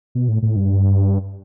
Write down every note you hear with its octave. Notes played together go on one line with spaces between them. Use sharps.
B2
A2
A2
G2